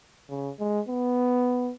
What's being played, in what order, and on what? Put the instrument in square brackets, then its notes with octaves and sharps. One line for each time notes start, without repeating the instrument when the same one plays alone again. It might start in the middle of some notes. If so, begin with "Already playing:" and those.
[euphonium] C#3
G#3
B3